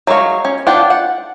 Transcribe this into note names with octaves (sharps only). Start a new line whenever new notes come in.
F#3 G#3 E4 C#5 F5
C#4
D4 F4 F#5 G5
F#5